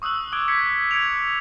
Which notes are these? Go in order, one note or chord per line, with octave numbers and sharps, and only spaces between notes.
C#6 D#6 E6 F#6 F#7
D6 D#6 F#6 G#6 D7 G7
G#6 B6 C#7
G#6 C#7 D7 F7